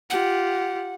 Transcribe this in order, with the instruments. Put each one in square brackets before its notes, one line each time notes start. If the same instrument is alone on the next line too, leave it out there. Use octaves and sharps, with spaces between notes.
[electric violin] F4 G4 [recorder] F#5